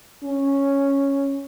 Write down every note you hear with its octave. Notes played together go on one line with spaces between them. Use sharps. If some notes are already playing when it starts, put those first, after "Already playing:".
C#4